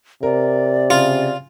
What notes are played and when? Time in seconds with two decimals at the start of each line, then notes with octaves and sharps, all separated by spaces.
0.23 C3 A#4 D5
0.90 C#3 F4